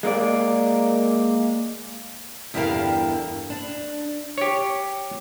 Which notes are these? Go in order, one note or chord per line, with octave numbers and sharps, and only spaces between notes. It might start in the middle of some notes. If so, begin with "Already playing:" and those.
G#3 A#3 D#4 D5
E2 G2 D3 G4 A#4 F5
D4
G4 C#5